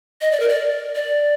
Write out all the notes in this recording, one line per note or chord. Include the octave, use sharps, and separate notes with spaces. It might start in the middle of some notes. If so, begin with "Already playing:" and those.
D#5
D5
A#4
D5
D5